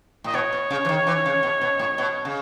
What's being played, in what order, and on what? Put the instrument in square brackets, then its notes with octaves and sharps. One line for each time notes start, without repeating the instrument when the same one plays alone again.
[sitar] A2 [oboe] D#5
[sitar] B2 [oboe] C#5
[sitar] B2
C#3
E3
D#3
E3
C#3
B2
B2
A2
B2
C#3